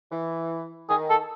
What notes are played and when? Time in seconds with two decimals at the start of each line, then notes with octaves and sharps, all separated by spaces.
0.11 E3
0.89 D#3 G#4
1.10 A4